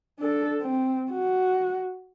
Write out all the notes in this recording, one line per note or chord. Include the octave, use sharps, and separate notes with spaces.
D4 A4
C4
F#4